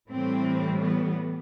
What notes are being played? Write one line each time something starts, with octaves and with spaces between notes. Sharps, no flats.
A2 E3 G3 C4
B3